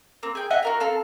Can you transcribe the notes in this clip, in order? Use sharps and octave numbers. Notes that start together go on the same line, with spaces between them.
A#3 C4
G#4 G5
D#5 E5 F#5 G#5
F#4 A#4 F5
C4 A4 F5